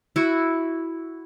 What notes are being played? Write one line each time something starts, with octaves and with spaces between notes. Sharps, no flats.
E4 F#4